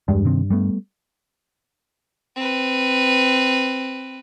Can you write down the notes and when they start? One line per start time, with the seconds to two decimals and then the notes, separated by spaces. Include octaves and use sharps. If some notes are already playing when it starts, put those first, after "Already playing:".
0.08 E2 G2 G3 G#3
0.25 C3 D#3 C4
0.50 G3 A3 B3
2.36 C4 B4